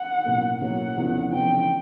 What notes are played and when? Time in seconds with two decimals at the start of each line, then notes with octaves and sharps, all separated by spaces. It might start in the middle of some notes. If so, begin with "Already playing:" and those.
Already playing: F#5
0.25 B1 A2 F#3 A#3 C#4
0.61 B1 A2 F#3 A#3 C#4 F#5
0.97 F1 E2 C#3 F3
1.32 F1 E2 C#3 F3 G5